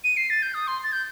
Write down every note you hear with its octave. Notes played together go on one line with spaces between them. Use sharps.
D#7
C7
A6
G6
D#6
C6
A6
G6